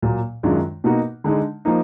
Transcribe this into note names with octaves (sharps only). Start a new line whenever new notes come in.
A#2 F#3 A#3
F#2 D#3 G#3 D4 F4
B2 A#3 D#4 F#4
D3 G#3 D#4
F3 A#3 D#4